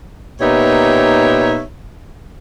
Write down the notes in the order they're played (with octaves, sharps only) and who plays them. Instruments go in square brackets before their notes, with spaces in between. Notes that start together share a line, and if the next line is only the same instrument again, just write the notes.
[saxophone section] A#2 B3 D#4 G4 C#5 E5